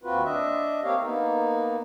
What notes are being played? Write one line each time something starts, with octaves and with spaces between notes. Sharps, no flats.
D#2 C4 F4 F#4 B4
D4 D#5 E5
A#3 C4 G4 C#5 F5
A#3 B3 D#4